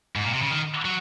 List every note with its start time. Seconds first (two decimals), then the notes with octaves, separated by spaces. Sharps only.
0.16 G#2
0.25 A#2
0.33 C3
0.42 C#3
0.50 D#3
0.85 F#3